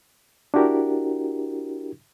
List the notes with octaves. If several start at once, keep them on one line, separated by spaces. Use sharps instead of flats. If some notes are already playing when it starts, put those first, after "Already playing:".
D4 E4 F#4 G4 A#4